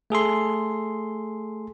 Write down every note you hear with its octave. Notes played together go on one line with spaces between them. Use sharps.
A3 G#4 A4 C6